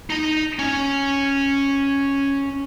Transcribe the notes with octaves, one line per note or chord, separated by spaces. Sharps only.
D#4 A#5
C#4